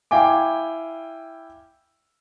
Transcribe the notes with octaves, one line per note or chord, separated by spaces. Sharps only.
E4 F5 G5 G#5 D6